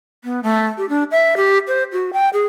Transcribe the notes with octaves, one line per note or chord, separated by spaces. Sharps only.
B3
A3
G4
D4
E5
G4
C5
F#4
G5
G#4